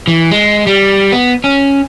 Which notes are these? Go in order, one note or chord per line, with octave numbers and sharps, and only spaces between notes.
E3
G#3
G3
B3
C#4